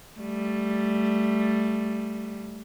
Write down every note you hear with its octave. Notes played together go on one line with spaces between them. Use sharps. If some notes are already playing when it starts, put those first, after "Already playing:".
G3 A3